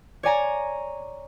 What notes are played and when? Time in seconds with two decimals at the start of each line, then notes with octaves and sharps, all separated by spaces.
0.23 C#5 D5 G#5 A#5